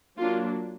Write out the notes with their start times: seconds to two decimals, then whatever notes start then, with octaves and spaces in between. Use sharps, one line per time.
0.18 F#3 A#3 D4 F4